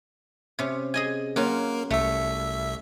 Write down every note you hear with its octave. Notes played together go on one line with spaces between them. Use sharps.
C3 C#4
G#4 D#5 G#5
F#3 A#3 C#4 F4 A#4
C2 A3 E5